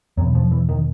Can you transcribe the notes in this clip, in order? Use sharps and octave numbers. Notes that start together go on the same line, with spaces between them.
E2 B2 F#3
F3
E3
D#3